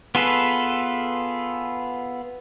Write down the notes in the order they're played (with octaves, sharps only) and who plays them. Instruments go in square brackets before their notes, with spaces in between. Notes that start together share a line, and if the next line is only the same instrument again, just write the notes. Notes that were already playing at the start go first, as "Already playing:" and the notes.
[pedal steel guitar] B3 F4 G#4 A4 B4